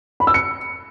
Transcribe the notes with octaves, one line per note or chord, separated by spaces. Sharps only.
B5
E6
C#7